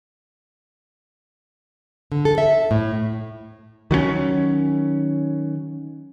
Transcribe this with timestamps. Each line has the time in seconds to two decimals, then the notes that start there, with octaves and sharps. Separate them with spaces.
2.12 D3
2.25 A4
2.38 E5
2.71 A2
3.91 D#3 F#3 G3 C#4